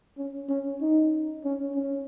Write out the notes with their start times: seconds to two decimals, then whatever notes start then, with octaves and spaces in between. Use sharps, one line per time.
0.18 C#4
0.49 C#4
0.81 D#4
1.45 C#4
1.76 C#4